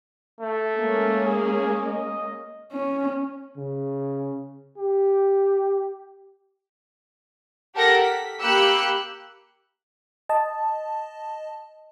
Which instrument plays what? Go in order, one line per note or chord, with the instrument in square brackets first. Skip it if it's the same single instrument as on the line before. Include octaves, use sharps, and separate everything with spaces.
[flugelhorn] A3
[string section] G#3 A#3 C#4
[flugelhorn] G#4
D#5
[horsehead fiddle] C#4
[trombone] C#3
G4
[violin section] G4 A4 A#4 F#5 A#6
B6
A#3 G4 B5 E6 F#6 C#7
[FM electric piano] D#5 A5